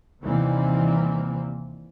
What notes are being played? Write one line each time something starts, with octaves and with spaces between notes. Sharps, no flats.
D#2 C3 E3 G3 A#3 C4